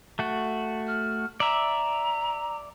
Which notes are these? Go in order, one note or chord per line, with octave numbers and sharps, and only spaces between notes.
A3 F#4
F6
D5 E5 A#5